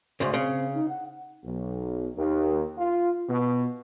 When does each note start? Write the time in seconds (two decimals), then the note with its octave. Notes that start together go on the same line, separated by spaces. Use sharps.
0.20 D2 G#2 C#3 C5
0.34 C#3 C4
0.73 D#4
0.88 F#5
1.43 B1
2.16 D#2
2.78 F4
3.29 B2